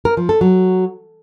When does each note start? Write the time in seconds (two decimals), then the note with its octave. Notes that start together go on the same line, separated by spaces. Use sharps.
0.05 A#4
0.17 F3
0.29 A4
0.41 F#3